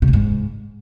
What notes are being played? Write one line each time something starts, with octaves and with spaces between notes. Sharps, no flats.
C3
F#2
G#2